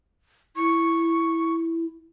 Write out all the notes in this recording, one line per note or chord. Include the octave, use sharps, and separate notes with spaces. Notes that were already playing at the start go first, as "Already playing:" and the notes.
E4 C#6